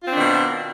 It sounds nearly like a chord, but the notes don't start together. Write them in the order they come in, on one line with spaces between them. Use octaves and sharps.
F4 C4 D4 D#3 B2